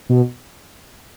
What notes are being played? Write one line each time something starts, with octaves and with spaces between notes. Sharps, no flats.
B2